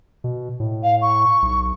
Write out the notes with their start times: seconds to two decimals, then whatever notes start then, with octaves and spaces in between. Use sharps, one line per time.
0.24 B2
0.60 A2
0.83 F5
1.02 C#6
1.42 B1